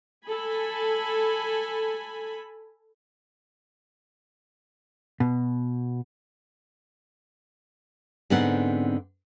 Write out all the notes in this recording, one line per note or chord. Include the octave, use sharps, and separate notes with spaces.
A4 G#5 B5
B2
G#2 D3 B3 C4 F#5